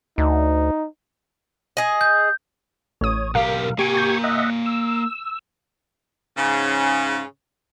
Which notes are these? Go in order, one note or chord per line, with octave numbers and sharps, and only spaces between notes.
D2 D#4
G#4 D#5
G6
A1 C#5 D#6
B1 G4 A#4 F5
A#3 G4 G#5 C#6 G#6 D7
G6
D#5 E5 F#5
E6
G#2 C#3